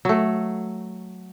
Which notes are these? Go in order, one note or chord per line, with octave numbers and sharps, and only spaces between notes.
F#3 A3